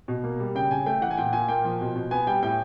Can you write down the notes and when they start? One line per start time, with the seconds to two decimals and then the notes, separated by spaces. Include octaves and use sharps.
0.08 B2
0.24 A#3
0.40 G3
0.55 C#3 G5
0.71 C#3 G#5
0.86 A3 G5
1.01 E3 F#5
1.11 G#5
1.17 A#2 G5
1.33 A#2 G#5
1.48 A#3 G5
1.65 F3
1.81 B2
1.96 B2
2.11 B3 G#5
2.27 G3 G5
2.42 A2 G5